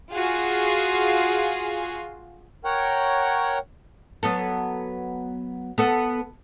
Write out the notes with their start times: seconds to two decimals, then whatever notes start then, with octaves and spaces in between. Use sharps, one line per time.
0.11 F4 F#4 G#4
2.65 A#4 C#5 F#5 G5
4.23 F#3 B3 A4
5.78 B3 A4